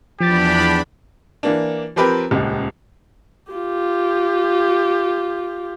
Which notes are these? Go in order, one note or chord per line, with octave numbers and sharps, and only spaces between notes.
E2 F3 D4 G4 B5 A6
E3 A#3 D4
F3 C4 G4 A#4 B4
D#1 C#2
F4 G4